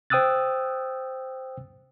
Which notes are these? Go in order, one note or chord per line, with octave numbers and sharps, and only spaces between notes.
C5 G5 D#6 E6 F#6 A6